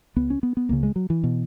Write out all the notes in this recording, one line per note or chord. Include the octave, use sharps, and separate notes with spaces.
C#2 C#3 B3
C#4
B3
B3
C#2 C#3 A#3
G#3
F#3
E3
B2